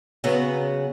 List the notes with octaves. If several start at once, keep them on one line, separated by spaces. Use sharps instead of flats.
C#3 F#3 B3